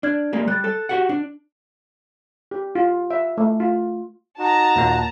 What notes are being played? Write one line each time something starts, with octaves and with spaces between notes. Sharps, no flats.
D4 D5 F6 G#6
G3 G#3 A#3
G3 F#6 A6
A4
F#4 G4 F#5
D4
G4
F4
E5
A3
F4
D#4 F#4 A5 A#5
D#2 A#2 A#3